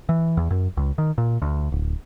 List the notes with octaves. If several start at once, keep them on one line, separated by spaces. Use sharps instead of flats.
E3
E2
F#2
C#2
D#3
A#2
D2
D1